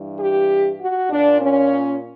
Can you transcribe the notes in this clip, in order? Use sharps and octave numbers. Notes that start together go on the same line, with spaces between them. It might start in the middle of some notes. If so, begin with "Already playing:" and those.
Already playing: G2 E3
G4
F#4
A#2 D4
C#4